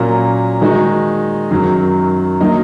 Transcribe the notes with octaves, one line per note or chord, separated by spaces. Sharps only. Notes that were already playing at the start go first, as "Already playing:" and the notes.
Already playing: A#2 F#3 A#3 C#4
D#3 G#3 D#4 F#4
F#2 D#3 F#3
D#3 F#3 A#3 D#4